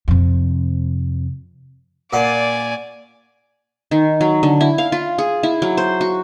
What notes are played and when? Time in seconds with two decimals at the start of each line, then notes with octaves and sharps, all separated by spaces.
0.08 F2 C3
2.13 A#2 D5 F#5 G#5 C6
3.91 D#3
4.21 F#3
4.43 D3
4.61 E4
4.78 F5
4.92 F4
5.18 G#4
5.43 E4
5.62 F#3
5.77 C5
6.01 F#4